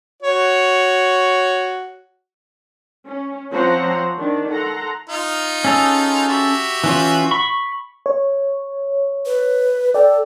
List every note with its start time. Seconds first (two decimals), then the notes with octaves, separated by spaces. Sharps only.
0.23 F#4 C#5
3.07 C#4
3.51 F3 C4 C5 C#5 F#5 A#5
4.17 D#3 D4
4.50 A4 F#5 A#5 C6
5.09 D#4 F4
5.64 C#4 G#4 A4
6.28 F#4 G4 E5
6.84 E3 C#4 F4
7.31 B5 C#6
8.06 C#5
9.26 B4
9.94 A4 D5 G5